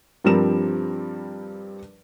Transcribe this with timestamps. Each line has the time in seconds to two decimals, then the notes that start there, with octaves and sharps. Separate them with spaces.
0.24 G2 F3 G3 C4 A#4 E7